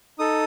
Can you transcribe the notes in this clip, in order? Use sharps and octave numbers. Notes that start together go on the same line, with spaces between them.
D#4 A4 D#6